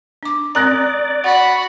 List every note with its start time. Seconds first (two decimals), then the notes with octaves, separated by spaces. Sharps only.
0.23 D4 D6
0.55 D5 A#5 D#6 F#6 A#6
1.24 F#4 F#5 B5 C#6